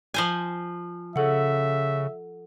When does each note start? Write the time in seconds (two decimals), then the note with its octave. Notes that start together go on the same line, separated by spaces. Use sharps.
0.14 F3 C5 G#5
1.16 C#3 A4 E5 F#5